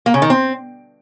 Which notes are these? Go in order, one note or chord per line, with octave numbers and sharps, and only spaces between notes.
A#3
C#3
D#3
C4